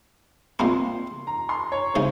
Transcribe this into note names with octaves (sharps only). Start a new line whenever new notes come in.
A#2 G#3 C4 C6
A#5
C6
C#5
C#3 G#3 D#4 C5